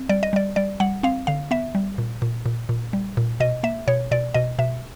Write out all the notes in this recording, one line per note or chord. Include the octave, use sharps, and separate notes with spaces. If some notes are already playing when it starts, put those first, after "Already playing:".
Already playing: C4
G3 D5
D#5
G3 D5
G3 D5
G3 F#5
C4 F5
D3 F5
B3 E5
G3
A#2
A#2
A#2
A#2
G3
A#2
B2 D#5
A#3 E5
B2 C#5
B2 D5
B2 D#5
B2 E5